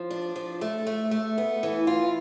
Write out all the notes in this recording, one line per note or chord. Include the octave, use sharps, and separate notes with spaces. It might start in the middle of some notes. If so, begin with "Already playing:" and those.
Already playing: F3
D4
F3
A3
A3
A3
B3
E3
F4